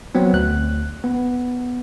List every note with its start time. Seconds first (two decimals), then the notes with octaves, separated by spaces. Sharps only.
0.15 F#3 B3 C4
0.33 D2 F#6
1.04 B3